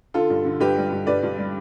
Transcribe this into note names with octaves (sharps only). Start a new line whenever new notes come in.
D3 F4 A4
G2
D3
G2 G4 B4
G3
G2
G2 B4 D5
G2
G3